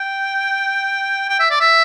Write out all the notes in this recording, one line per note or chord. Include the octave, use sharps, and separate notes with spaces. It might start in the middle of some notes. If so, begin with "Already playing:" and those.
Already playing: G5
G5
E5
D5
E5